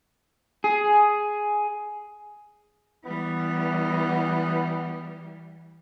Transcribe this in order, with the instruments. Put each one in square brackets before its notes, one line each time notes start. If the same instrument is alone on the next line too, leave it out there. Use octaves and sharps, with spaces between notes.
[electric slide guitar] G#4
[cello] E3 G3 [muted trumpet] B3